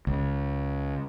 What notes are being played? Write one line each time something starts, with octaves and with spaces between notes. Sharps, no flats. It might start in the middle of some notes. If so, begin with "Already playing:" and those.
C#2